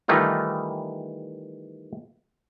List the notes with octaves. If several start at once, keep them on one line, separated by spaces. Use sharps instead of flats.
D#3 E3 G3 A3 D#4 F4